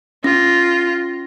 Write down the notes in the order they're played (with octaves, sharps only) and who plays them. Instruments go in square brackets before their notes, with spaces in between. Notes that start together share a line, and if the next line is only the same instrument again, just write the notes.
[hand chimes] C#4 A#6 [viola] F4